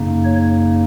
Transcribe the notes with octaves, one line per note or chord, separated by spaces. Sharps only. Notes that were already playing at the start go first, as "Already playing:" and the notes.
Already playing: F#2 C#3 A#3 D#4
C#5